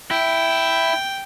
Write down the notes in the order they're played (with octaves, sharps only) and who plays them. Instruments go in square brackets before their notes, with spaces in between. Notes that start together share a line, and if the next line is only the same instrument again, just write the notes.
[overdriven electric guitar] E4 [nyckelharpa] G5